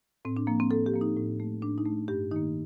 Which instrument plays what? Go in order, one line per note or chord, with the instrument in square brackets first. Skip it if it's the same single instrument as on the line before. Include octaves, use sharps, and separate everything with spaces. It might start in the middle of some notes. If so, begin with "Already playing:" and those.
[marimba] A2 C4
D4
F3 A#3
C4
A2 A4
G4
F3 A#3
D#4
A2
A3
A2 D4
D#4
A3
G2 G4
D#3 A#3 D#4